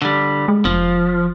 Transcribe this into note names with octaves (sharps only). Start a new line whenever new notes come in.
D3 G3
G#3
F1 F3